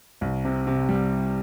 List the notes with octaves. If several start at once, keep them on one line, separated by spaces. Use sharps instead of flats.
C2
C3
C3
G3